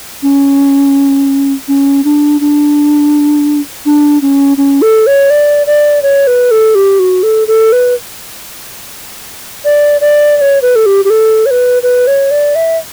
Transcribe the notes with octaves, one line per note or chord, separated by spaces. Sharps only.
C#4
C#4
D4
D4
D4
C#4
C#4
A4
C#5
D5
D5
C#5
B4
A4
G4
F#4
A4
A4
B4
D5
D5
D5
C#5
B4
A4
G4
G4
A4
C#5
B4
B4
C#5
D5
E5